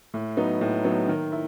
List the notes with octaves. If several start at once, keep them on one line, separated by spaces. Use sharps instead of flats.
A2
F#3 B3 D#4
A2
F#3 B3 D#4
D#3
E4